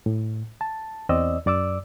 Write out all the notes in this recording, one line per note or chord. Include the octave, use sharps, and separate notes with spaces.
A2
A5
E2 C4 D5 D#5 E6
F#2 D5 D6 E6